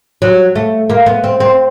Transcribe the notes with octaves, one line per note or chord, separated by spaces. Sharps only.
F#3
A3
A#3
B3
C4
C4